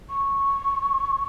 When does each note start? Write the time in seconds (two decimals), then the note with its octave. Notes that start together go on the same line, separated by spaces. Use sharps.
0.09 C#6